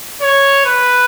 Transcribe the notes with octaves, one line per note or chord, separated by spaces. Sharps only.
C#5
B4